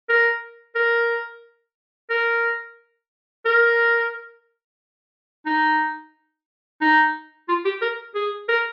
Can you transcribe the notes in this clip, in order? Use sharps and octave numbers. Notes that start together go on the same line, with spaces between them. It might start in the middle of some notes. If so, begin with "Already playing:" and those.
A#4
A#4
A#4
A#4
D#4
D#4
F4
G4
A#4
G#4
A#4